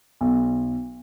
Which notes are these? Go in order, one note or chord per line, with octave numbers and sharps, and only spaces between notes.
B1